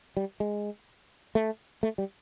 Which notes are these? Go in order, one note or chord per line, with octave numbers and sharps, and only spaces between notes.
G3
G#3
A3
A3
G3